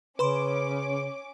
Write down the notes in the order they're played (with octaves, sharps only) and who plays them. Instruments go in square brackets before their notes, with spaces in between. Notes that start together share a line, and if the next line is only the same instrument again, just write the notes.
[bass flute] C#3 [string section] C#4 D6 [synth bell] B4 B5 C6